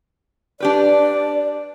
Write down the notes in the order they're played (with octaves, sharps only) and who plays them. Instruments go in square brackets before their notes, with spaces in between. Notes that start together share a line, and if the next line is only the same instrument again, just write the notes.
[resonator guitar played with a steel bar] D4 G4 B4 [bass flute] D5